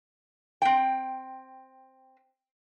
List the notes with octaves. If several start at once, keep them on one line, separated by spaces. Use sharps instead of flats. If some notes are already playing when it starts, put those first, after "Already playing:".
C4 G5